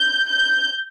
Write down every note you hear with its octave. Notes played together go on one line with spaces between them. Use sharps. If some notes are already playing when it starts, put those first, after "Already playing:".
Already playing: G6
G6